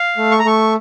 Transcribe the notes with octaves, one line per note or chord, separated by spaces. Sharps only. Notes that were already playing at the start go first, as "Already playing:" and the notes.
Already playing: F5
A3
C#6
A#5
A3 C#6